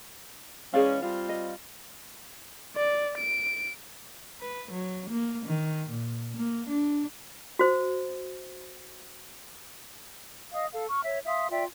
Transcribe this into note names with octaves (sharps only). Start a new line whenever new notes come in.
E3 G#3 C#4 G#4 D5 F5
G3 C4 F4
D#5
D5
D7
B4
F#3
A#3
D#3
A#2
A#3
D4
F#4 C5
D#5 F5 D#6
A4 F5
C#6 F6
C#5 E5
E5 F5 C6 D#6
F4 D5 E5 G5